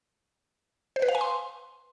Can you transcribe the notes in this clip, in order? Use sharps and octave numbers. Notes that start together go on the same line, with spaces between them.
C5
B4
F5
G#5
C6